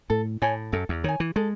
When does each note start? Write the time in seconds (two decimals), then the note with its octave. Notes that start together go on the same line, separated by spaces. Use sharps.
0.10 A2 A4
0.42 A2 C#5 G#5
0.72 F#2 A4
0.89 E2
1.04 D#3 C#5 G#5
1.20 E3
1.36 G#3 A4